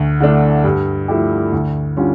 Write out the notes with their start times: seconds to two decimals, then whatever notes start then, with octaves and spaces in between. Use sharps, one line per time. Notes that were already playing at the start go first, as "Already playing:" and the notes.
Already playing: D2
0.20 D3 A3 D4
0.64 G2
1.08 F3 A3 E4 G4
1.52 D2
1.97 D3 G3 C#4 F4